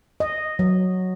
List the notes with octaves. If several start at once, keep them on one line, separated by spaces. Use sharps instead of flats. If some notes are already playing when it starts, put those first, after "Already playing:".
D#5
F#3